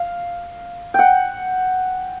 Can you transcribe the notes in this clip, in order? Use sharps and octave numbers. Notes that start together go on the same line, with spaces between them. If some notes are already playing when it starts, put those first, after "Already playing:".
Already playing: F5
F#5 G5